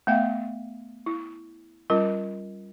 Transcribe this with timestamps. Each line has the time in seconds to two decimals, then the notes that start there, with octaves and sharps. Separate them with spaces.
0.07 A3 B3 E5 F5 G5
1.06 E4
1.90 G3 C#4 F4 A#4